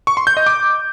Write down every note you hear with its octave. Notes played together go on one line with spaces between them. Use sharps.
C#6
C6
G6
D#5
D6